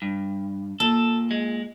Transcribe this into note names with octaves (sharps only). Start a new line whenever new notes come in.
G2
A#2 A4
G#3